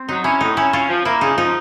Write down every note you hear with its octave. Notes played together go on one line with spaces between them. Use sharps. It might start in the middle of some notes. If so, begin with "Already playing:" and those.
Already playing: C4
F#3 D#4
C#4 E4
A2 D#4
C#4 E4
C#4 F4
F3
A#3 E4
C#3 D#4
F3 D#4